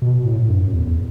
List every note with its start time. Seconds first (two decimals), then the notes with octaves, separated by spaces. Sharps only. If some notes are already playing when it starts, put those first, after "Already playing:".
0.02 B2
0.25 A2
0.43 A2
0.49 F#2
0.73 E2
0.86 E2